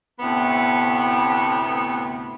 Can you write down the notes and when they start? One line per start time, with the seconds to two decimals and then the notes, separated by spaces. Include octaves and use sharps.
0.20 D2 A2 C3 B3